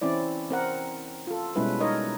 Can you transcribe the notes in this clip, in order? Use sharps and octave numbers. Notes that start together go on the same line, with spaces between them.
E3 C4 C#4 E4 D5
C4 A#4 F#5
F4 A4
B2 G3 G#3 C#4 E4 B4
D#4 A#4 C#5 D#5